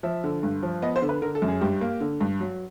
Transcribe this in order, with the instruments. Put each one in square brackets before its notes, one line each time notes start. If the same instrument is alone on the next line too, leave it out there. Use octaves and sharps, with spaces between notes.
[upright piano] F3 E5
D3
G2
F3
B3 D#5
C5
D3
B4
D3 A#4
A4
F#2
G#4
G2 G4
A#3
D3
G2
F#3